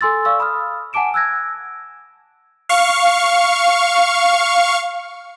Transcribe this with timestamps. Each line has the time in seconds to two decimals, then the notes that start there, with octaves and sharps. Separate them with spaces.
0.01 A4 G#5 C6 E6 A6
0.25 D5 F5 C#6 E6
0.40 B5 D#6 F6
0.93 F#5 G#5 A5 D6 D7 E7
1.14 E6 F#6 G#6 A#6
2.69 F5 C#6